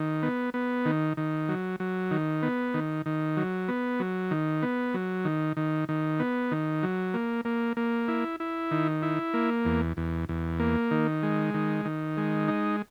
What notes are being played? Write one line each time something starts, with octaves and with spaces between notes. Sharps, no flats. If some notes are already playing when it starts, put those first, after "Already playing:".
Already playing: D#3
B3
B3
D#3
D#3
F#3
F#3
D#3
B3
D#3
D#3
F#3
B3
F#3
D#3
B3
F#3
D#3
D#3
D#3
B3
D#3
F#3
A#3
A#3
A#3
E4
E4
D#3
E4
A#3
E2
E2
E2
A#3
D#3
G#3
D#3
D#3
G#3
D#4